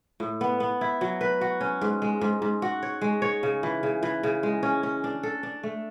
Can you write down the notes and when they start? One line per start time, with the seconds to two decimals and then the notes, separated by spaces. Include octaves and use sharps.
0.20 A2
0.41 B3
0.60 B3
0.81 E4
1.01 F#3
1.21 B4
1.41 F#4
1.61 C#4
1.82 G#2
2.02 G#3
2.21 G#2
2.42 G#2
2.62 F#4
2.83 C#5
3.01 G#3
3.22 C#5
3.43 C#3
3.63 E3
3.83 C#3
4.03 E3
4.23 C#3
4.43 G#3
4.63 C#4
4.83 C#4
5.04 D4
5.23 A4
5.43 D4
5.63 A3